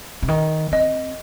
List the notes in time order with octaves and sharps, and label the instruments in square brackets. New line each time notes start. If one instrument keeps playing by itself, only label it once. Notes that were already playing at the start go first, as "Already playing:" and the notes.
[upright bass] C3
D#3
[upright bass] C4 [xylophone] D#5